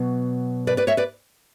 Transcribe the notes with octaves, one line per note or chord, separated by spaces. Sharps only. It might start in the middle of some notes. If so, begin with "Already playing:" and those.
Already playing: B2 F#3
B4 D5
B4 D5
C#5 E5
B4 D5